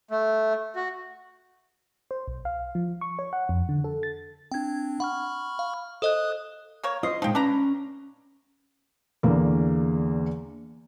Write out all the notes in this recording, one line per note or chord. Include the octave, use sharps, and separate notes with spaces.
A3
F#4
C5
B1
F5
F3
C#6
C#5
F#5
F2
D3
A4
A6
C4 D4 G5 G#6
F#5 B5 C#6 F6
F5
A4 C5 D#5 D#6 F#6
A#3 A#4 C#5
F4 C5 D#5
A#2 F3 G#3 D#4 G5
C#4 D4 B4 A#5
E2 D3 A#3